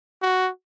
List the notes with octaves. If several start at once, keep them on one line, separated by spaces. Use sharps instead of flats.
F#4